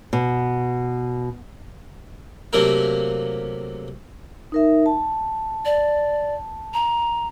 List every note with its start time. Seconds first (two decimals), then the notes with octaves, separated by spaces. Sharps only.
0.13 B2
2.53 C3 F#3 A3 A#3 A#4
4.52 D#4 A#4 E5
4.86 A5
5.65 D5
6.74 A#5